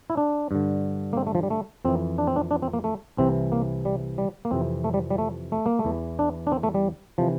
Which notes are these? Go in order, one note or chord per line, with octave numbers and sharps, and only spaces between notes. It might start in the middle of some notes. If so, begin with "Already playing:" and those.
E4
D4
G2 D3
A#3
C4
A3
F3
G3
A3
F2 E3 C4
D4
C4
D4
D4
C4
A#3
A3
C2 C3 E3 C4
A#3
G3
G3
A#3
F2 C3 E3 C4
A3
G3
G3
A3
A3
A#3
A3
E2 E3
D4
D4
C4
A3
G3
C3 E3 F3